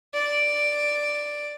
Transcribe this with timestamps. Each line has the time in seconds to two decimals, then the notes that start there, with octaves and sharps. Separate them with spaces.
0.14 D5